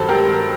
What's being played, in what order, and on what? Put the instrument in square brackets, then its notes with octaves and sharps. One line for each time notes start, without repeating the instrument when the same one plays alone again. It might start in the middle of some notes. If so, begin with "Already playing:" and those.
Already playing: [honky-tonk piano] G2 D#3 F#3 A4 C5
G4 A#4